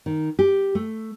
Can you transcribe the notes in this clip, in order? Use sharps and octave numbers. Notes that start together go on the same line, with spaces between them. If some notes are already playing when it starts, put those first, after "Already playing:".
D#3
G4
A3